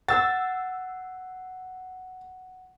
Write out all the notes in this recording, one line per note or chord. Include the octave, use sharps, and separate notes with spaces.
F#5 E6 A6